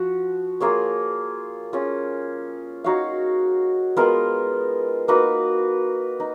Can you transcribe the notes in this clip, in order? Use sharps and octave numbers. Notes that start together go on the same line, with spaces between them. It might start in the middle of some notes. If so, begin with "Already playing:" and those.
Already playing: F3 F#4
A#3 F4 G#4 C#5
C#4 F4 G#4
D#4 F#4 C#5 F5
G#3 B3 F4 A#4
A#3 D#4 F#4 B4
D#4